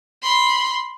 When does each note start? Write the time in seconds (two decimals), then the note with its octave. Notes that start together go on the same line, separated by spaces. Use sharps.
0.23 B5 C6